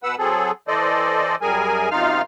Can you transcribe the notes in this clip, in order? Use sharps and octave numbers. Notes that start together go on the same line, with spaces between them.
B2 B4 F#5 E6
F#3 C4 G#4 A4
E3 A4 C5 D5 D#5
F#2 G3 G#4 A#4 G#5
F#2 C3 D#4 F4 F5 F6